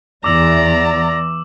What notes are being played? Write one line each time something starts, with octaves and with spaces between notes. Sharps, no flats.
E2 D5 A#5 D6 E6